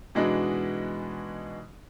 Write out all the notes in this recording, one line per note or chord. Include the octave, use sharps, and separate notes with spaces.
B2 E3 G#3 D4 D#4 F#4